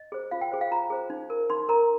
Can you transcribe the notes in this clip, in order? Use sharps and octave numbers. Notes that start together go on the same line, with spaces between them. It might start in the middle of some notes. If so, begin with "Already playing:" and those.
Already playing: D#5
G#4 C5
F4 F5
G5
G#4 C5
F5
F4 A#5
G#4 C5
D#4
A#4
D#4 C6
A#4 A#5